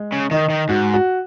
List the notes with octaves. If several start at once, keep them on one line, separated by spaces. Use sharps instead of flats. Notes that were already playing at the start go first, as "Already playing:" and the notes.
Already playing: G#3
C#3
D#3 D#4
D#3
G#2 F#4
F#4